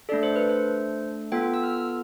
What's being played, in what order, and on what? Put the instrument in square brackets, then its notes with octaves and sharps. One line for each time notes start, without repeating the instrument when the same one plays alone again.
[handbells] A3 D4 A4 D5
C5
B4
C5
B3 F4 A4 G5
E6
F6